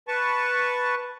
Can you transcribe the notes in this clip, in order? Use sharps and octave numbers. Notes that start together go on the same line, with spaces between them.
B4 A5 C#6